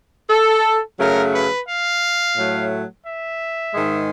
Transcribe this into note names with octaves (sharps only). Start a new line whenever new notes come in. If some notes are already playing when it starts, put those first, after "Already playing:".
A4
F#2 C#3 F#3 A3 A#4
B4
F5
A2 F#3 A3
E5
G#2 D#3 G#3